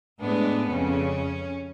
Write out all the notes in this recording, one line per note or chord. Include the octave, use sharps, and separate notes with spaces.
A2 G#3 B3 D4
F2 C#3 C#4